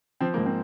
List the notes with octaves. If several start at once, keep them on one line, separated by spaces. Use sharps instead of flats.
F3 C4
A#3
G#2
C4